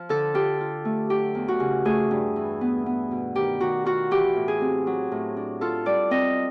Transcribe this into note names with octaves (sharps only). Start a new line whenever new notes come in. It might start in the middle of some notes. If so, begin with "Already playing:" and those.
Already playing: F3
D3 A4
F4 G4
F4
A3
F#3 G4
E2
F#4
C#3
A3 G#4
G2
E3
B3
B3
B2
D#3 G4
D#3 F#4
F4 F#4
E3 G4
A2
G#4
C4
F#3
A2
D4
F4 A4
G3 D5
C4 D#5